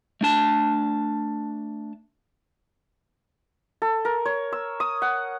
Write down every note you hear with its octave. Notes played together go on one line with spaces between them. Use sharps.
A3 D4 A5
A4
A#4
C#5
E6
D#6
F#5